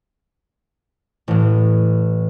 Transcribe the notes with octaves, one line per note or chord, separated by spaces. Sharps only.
A1 A2